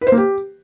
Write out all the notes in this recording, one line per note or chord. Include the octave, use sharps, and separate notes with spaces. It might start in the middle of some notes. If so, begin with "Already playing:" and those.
B4
C5
A#3
G4